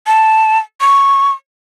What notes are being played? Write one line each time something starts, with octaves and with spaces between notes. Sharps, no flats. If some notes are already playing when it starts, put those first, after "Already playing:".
A5
C#6